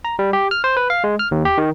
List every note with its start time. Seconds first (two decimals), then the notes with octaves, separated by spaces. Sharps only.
0.05 A#5
0.19 G3
0.33 G4
0.51 F6
0.64 C5
0.77 B4
0.90 F5
1.04 G#3
1.19 F6
1.31 D#2
1.45 G4
1.58 D#3